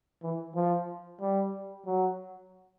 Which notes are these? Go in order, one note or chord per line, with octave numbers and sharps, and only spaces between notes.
E3
F3
G3
F#3